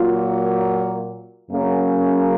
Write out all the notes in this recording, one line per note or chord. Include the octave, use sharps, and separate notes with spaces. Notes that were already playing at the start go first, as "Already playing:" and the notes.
Already playing: A#2 F#3 A#3 F4
F#2 C#3 F#3 A#3 C#4